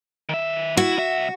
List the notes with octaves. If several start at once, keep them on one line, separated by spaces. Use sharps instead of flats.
D#3 E5
E4 F#4
C2 E5